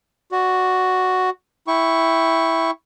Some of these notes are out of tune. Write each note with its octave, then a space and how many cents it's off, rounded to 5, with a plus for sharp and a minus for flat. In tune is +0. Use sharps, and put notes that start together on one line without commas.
F#4 +0 D5 +0
E4 +0 G5 +0 C#6 +0